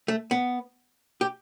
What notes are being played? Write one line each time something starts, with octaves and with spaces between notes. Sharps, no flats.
A3
B3
G4